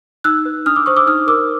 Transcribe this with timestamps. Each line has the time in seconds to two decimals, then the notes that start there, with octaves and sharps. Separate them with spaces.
0.24 D#4 E6 F#6
0.45 B4
0.66 D4 D#6 F6
0.76 D6 E6
0.86 C5 C#6 D#6
0.96 D6 E6
1.06 D#4 D#6 F6
1.27 A#4 D6 E6